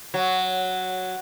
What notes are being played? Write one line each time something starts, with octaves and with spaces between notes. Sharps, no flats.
F#3